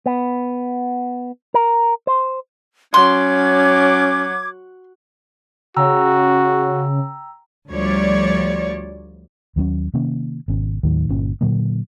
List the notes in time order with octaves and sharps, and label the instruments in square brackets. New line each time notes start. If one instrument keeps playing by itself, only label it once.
[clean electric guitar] B3
A#4
C5
[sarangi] F#3 [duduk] C#4 [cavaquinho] C6 [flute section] D6 G#6
[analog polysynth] C#3 [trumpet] F#4 [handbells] G5 A#5 E6
[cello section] D2 F3 G3 C#5 D5
[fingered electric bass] D#2 F#3 C4 C#4
C3 D#3 A#3 C#4
G#1 B2 C#4
D#2 A2 D#3 F#3
G1 A#2 C#4
A#2 D3 F#3 A#3